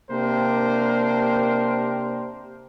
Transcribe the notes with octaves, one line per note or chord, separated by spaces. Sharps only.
C3 A#3 D4 G4 A#4 C5